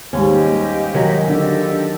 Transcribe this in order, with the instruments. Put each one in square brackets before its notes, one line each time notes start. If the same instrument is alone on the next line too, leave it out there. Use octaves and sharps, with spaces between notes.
[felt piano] D#2 G#2 G3 [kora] C#4
[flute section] G4 D#5 G#5
[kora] D#3 F#3
[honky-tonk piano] D3 [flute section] G4 A4 D#5